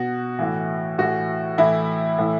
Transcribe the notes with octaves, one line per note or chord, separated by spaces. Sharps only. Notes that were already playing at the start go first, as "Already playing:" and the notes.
Already playing: B2 F#4
A2 E3
A2 E3 F#4
A2 E3 E4
A2 E3